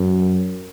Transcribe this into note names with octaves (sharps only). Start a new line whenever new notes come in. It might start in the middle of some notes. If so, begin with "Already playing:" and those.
Already playing: F#2